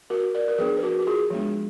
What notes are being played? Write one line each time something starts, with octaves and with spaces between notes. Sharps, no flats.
F#4 A#4
A#4 D5
A#4
F3 B3 D4 G#4 B4
B4
F#4 A#4
F#4
F4 G#4
F3 G#3 B3 D4